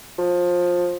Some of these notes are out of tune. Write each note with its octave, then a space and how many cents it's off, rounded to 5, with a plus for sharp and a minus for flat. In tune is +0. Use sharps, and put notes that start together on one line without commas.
F3 +20